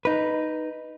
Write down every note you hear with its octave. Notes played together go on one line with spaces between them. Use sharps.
D#4 B4